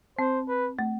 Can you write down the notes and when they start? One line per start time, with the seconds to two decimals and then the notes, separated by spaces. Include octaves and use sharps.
0.19 C4 C5
0.48 B4
0.79 A3